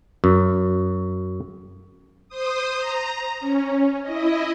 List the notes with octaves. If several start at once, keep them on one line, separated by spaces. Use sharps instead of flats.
F#2
C5 D#6
A#5
C#4
E4 D#5